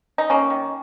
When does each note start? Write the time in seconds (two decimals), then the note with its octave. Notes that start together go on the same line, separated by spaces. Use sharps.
0.18 D#4
0.30 A#3 C#4
0.50 D#3